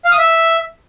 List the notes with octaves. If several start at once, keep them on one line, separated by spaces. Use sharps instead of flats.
F5
D#6
E5